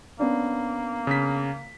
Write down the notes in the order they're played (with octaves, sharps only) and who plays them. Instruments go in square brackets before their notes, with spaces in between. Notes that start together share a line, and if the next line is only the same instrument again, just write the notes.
[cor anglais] A#3 [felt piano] B3 C#4 D4
[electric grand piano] C#3 B6